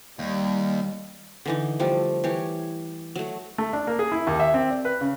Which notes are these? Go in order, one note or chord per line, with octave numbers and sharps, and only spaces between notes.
D#2 G3
D3 E3 D#4
F3 G3 A3
E3 G4 C#5
F#3 A3
A3
D4
A#3
G#4
E4
D#2
E5
C4
D5
B4
C#3